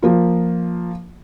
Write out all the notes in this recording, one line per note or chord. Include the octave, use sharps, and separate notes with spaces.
F3 A#3 F4